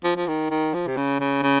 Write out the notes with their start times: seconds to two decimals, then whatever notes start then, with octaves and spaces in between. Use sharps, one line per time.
0.04 F3
0.16 F3
0.27 D#3
0.50 D#3
0.74 F3
0.87 C3
0.96 C#3
1.20 C#3
1.43 C#3